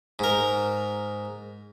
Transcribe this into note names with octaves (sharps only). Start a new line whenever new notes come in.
G#2 A#4